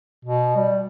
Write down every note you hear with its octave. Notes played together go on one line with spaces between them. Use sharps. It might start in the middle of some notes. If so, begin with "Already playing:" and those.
B2
G3